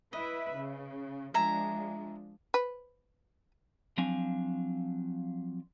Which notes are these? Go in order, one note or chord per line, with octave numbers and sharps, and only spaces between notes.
E4 B4 D#5 E5
C#3
F3 G#3 D4 E5 G#5 A#5
B4
F3 F#3 C4 D4 F5 G#5